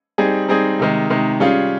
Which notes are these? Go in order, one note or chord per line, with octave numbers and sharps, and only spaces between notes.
G3 C4 D#4 G#4
G3 C4 D#4 G#4
C3 D#3 G#3
C3 D#3 G#3
G3 C#4 F4 G#4